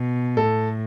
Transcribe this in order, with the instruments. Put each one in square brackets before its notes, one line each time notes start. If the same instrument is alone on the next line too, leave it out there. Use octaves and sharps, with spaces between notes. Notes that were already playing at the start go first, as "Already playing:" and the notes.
Already playing: [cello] B2
[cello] A2 [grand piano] A4